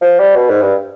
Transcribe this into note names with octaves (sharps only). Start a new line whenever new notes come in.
F3
G3
B2
G#2
G2